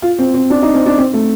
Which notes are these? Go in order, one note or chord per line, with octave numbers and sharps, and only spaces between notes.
F4
C4
C4
D4
D#4
C4
D4
C4
A3